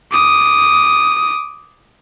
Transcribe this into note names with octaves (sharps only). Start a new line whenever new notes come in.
D6 D#6